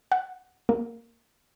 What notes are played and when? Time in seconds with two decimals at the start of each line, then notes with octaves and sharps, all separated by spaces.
0.12 F#5
0.69 A#3